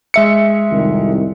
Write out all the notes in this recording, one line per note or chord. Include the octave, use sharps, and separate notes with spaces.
G#3 E5 C#7
C2 F2 D#3